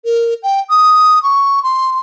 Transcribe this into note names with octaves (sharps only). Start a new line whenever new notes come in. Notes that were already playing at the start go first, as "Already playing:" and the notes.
A#4
G5
D#6
C#6
C6